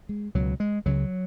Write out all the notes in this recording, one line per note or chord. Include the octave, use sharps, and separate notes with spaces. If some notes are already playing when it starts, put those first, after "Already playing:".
G#3
C#2 B2 F#3
G#3
C#2 C#3 F#3